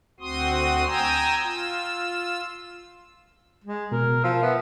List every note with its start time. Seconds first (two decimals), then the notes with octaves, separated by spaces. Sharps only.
0.20 D2 C4 F#4 C6 D#6
0.86 G5 G#5 A#5 D#6 E6
1.43 F4 E6
3.64 G#3
3.92 B2 A#4
4.24 F3 E6
4.43 B3 E5